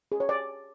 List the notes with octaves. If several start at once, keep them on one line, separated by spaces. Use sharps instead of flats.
G#4
C#5
D5